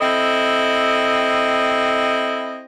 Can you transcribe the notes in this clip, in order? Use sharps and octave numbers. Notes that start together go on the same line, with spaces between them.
C4 E4 A4 D#5